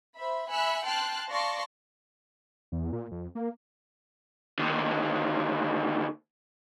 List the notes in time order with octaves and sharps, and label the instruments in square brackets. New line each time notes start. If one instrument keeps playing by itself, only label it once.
[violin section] C5 E5 B5
E5 G#5 B5 E6 F#6 C#7
G5 A5 C6 F6 F#6
D5 F5 A5 C6 C#6 A#6
[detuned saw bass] E2
A#2
F2
A#3
[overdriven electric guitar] D2 D#3